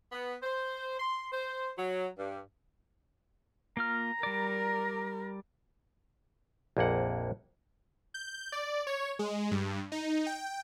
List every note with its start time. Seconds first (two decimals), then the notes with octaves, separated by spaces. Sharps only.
0.12 B3
0.43 C5
0.99 C6
1.32 C5
1.77 F#3
2.17 G2
3.77 A#3 F4 A#5 F6
4.23 G3 A#4 D5
6.77 A#1 F2 A#3 F#5
8.14 G6
8.52 D5
8.87 C#5
9.19 G#3
9.51 G2
9.92 D#4
10.26 G5